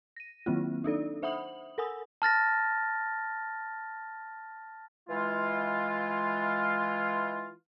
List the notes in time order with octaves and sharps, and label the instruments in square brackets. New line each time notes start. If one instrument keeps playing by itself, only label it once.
[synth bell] A#6 D#7
D#3 F#3 A#3 C4 E4 F4
D4 D#4 A4 D5
C5 E5 F#5 B5 D#6 F#7
A4 A#4 F#5 G#5 D#6 E6
[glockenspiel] A5 F6 A6 A#6
[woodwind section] E3 G#3 F4